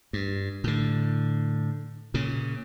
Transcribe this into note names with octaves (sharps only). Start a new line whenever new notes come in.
G2
A2 D3
A#2 C#3